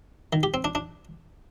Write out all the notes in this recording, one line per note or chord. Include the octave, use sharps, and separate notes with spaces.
D#3
G4
C4
D4
D4